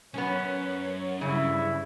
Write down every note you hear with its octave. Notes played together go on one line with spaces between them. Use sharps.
B1 F#2 B3 C#4 C#5
G2 C#3 E4